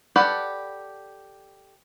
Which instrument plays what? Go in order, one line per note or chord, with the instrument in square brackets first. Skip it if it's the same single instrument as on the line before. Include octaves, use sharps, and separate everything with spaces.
[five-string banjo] G4 A4 B4 D5 F#5